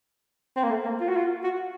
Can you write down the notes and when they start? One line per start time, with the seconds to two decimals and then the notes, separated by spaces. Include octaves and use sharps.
0.56 C4
0.64 A#3
0.70 A3
0.85 A#3
1.01 F4
1.09 F#4
1.16 F4
1.44 F#4